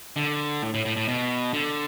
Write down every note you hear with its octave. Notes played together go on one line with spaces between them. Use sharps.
D3
A2
A2
A2
A2
B2
D3